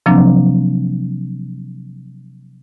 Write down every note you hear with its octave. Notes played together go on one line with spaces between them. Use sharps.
C3 F3 F#3 A#3 C4 D4